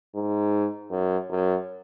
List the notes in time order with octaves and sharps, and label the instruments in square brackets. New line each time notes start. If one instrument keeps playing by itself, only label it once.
[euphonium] G#2
F#2
F#2